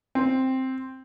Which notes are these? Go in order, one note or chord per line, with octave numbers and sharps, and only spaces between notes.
C4